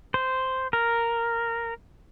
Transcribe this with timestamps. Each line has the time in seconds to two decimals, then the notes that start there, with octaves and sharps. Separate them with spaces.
0.14 C5
0.73 A#4